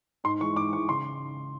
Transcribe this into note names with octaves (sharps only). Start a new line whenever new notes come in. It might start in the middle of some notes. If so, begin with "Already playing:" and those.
G#2 C6
E3 G#3 C#6
G#2 D6
E3 G#3 C#6
C#3 C6